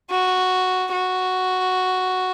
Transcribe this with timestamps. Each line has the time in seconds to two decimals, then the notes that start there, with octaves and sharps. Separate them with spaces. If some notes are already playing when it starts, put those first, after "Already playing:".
0.11 F#4
0.92 F#4